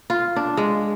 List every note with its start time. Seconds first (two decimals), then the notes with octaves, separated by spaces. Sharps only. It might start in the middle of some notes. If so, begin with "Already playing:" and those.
0.10 F4
0.36 D4
0.57 G#3